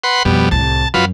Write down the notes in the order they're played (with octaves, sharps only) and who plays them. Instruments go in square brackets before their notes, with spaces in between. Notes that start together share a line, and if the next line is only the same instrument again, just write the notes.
[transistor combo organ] B4 F#5 C6
[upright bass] F2 [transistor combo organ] B2 G3
[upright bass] C2 A2 [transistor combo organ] A5
[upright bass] F#2 [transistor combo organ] F#3 F4 B4